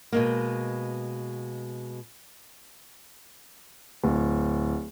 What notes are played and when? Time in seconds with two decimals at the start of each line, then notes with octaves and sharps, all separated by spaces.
0.12 B2 G#3 A#3
4.04 D1